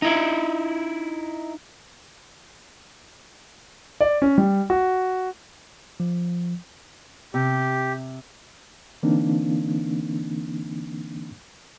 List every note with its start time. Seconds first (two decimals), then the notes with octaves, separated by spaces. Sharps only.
0.02 D#4 E4
4.00 D5
4.22 C#4
4.38 G3
4.70 F#4
6.00 F3
7.34 C3 G4
9.03 D3 E3 A#3 C4 D4 D#4